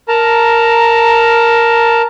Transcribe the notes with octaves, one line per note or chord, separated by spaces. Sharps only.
A#4 A5 A#5